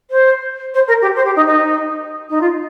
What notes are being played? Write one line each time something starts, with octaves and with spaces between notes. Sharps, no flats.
C5
C5
A#4
G4
C5
G4
D#4
D#4
D#4
F4